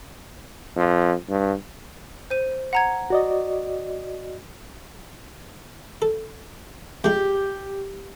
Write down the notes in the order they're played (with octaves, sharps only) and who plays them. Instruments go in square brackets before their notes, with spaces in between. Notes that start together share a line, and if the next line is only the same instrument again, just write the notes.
[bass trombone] F2
G2
[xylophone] C5 D#7
F#5 A#5 G#6
[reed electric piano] F#4 D5 D#5
[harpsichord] A4
[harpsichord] F2 G#3 [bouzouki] G4